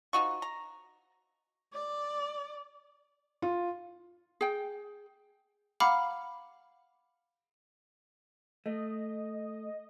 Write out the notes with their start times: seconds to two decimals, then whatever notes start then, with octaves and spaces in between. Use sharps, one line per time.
0.13 F3 D#4 F#4 C#6
0.42 A#5
1.74 D5
3.42 F4
4.41 G#4 G5
5.80 F5 F#5 A#5 B5 D6 F6
8.66 A3 D#5